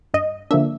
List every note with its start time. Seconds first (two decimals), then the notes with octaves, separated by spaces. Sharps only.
0.14 G2 D#5
0.51 D3 F3 A#3 D4 E5